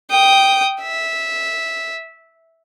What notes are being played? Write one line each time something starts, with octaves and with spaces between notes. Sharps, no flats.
G5 D#6
E5